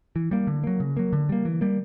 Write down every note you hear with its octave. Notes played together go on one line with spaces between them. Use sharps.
E3
G3 A#3
D3
F#3 A#3
C#3
F#3 A#3
D3
G3 A#3
E3
G3 A#3